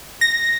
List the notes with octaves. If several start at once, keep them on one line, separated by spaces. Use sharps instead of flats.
A#6